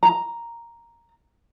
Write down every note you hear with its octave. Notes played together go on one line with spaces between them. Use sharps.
A#5